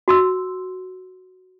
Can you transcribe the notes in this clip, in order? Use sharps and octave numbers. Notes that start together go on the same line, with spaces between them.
F#4 C6 E6